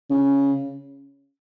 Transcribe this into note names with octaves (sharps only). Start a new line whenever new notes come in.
C#3